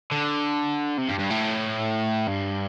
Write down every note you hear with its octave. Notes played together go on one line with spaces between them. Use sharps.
D3
C3
G2
G2
A2
G2